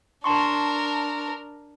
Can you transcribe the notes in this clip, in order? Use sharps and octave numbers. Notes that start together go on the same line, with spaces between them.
D4 A#4 A5 C6 C#6